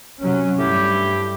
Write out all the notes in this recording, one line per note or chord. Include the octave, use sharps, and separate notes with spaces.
C3 F#3 C#4
G2 A3 E4 G4